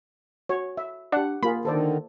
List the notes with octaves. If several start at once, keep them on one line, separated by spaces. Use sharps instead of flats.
F#4 C#5
E5
D4 G4 F#5
A#3 F4 G#4 B5
D3 D#3 A4 C5 D5